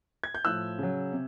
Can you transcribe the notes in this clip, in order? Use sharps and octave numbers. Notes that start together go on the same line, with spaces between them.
G#6
G6
A2 F3 E6 F#6
C#3 F#3
C3